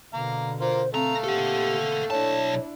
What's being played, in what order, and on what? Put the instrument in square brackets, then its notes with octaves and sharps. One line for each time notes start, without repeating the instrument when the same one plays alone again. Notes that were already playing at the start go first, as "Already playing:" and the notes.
[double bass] B2 D3 [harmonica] F5 A#5
[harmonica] A#3 F4 A#5 [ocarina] C5
[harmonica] A3 F5 [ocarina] C4 [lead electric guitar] A#5
[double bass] A#2 C4 [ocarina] G4 [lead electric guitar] A4 F#5
[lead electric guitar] B1 A5 [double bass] D4 E4 [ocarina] C#5